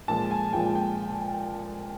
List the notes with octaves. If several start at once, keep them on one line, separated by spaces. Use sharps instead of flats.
A#2 F3 G#3 A5
G#5
A#2 F3 G#3 G5
G5